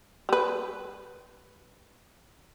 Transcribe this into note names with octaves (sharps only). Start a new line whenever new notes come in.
G3 B4